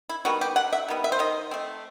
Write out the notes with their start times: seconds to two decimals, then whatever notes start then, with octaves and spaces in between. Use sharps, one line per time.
0.09 E4
0.25 D#3 G3 B3 F#4
0.41 G4
0.56 C3 F#5
0.73 E5
0.88 D#3 G3 B3
1.04 E5
1.12 C5
1.19 D#3 D#5
1.51 A3 C4